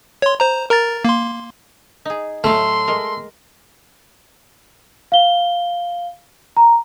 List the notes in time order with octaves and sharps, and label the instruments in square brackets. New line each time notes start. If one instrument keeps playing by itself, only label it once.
[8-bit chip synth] C#5 C6
C5 A#5
A#4 A#5 A6
A#3 C6
[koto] D#4 G#4
[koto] A2 F#3 F5 [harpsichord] A3 [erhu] C6
[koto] G#3 A#4
[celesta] F5 G7
A#5